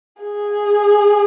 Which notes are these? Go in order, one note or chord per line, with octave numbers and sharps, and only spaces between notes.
G#4